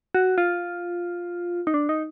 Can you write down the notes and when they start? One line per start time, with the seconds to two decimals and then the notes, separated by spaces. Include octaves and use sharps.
0.15 F#4
0.38 F4
1.67 D#4
1.74 D4
1.89 D#4